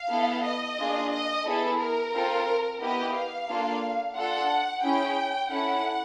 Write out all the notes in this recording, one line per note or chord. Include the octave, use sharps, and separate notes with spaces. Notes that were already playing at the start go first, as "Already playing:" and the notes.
Already playing: F5
B3 E4 A4
D#5
A#3 D4 F4 G#4
D#5
B3 E4 G#4 A4
A#4
C4 F4 A4
B3 E4 G4 D#5
F5
A#3 D4 F4 A4
D4 F4 A4 F#5
C#4 E4 G#4 G5
C#4 E4 A4 F#5